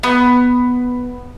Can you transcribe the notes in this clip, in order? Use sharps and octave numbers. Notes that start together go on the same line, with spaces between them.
B3